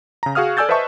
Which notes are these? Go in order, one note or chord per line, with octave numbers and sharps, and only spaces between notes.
C#3 A#5
F#4 G#4 F5 D#6 F6
A4 D5 G#5 E6 G6 A6
B4 C5 D#5 E5 A5 C#6